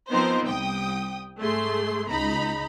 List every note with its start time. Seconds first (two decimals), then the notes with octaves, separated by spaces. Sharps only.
0.11 F3 B3 C4 D#4 A#4 C5
0.48 C2 G5 D#6
1.39 G#2 A3 G#4 C6
2.11 C#2 D#4 A#5 B5